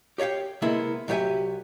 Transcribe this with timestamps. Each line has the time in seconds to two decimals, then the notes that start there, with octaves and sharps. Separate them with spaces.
0.18 G4 C#5 D5 F5 G5
0.62 C3 G#3 A#3 B3 E4
1.08 C2 F#3 G4 C5 E5 G#5